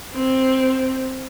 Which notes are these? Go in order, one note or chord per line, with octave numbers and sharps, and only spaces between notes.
C4